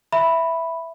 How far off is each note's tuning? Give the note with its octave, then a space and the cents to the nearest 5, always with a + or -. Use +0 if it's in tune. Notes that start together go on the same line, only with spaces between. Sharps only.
E5 +0 B5 +0